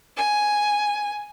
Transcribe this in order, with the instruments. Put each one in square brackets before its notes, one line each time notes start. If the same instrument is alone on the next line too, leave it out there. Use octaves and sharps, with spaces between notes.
[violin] G#5